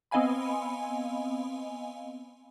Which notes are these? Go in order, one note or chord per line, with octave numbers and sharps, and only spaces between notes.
B3 C4 D#5 F5 G#5 B5